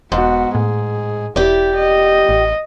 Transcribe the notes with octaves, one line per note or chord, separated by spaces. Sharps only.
E1 G#2 B3 F#4
A2 G#4
E1 E4 G4 D5
D#5
A1